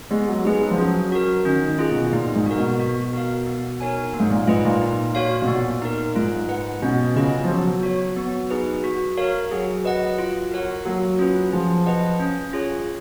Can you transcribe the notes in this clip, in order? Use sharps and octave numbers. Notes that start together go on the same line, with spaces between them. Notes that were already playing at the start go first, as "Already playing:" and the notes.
G#3 B3
F#3
G#3 D#4 G#4 B4
F#3
F3
F#3 C#4
F#4 A#4
D#3 C#4
D#3
F4 G#4
B2
A#2 D#4
G#2
F#4 A#4
B2
F#4
A#4 F5
B3
D#4 A#4 C#5 G#5
A#3
G#2
A#2
G#2 F4 B4 D#5
A#2
D#4
F#4 C#5 F5
B2
A#2 B3
D#4 A#4
G#2 F4
B4 F#5
B2 C#4
C#3 F4 B4 D#5
F3
F#3 B3
F#4 C#5
B3
D#4 G#4 B4
F#4
A#4 C#5 F5
F#3 G#4
B4 D#5 F#5
F4
A#4 C#5 F#5
F#3 A#3
C#4 F4 B4
F3 G#4
B4 D#5 F#5
C#4
F4 G#4 C#5